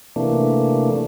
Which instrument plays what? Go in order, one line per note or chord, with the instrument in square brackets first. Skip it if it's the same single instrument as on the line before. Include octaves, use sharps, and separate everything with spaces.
[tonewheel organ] C3 E3 A3 A#3 D4